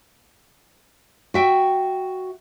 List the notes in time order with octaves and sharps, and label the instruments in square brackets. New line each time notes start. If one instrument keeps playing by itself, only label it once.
[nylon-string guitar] F#4 E5 G5